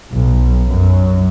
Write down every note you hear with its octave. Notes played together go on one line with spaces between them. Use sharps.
B1
F#2